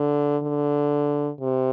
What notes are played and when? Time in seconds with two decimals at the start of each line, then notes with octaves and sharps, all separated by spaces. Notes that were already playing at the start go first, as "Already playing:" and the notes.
Already playing: D3
0.43 D3
1.41 C3